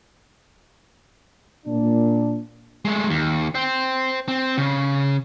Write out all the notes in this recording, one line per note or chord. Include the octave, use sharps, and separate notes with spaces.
A#2 D4
G#3 A3
D#2
C5 G5
C4
C#3